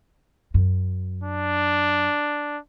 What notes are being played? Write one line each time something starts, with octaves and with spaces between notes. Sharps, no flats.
F#2
D4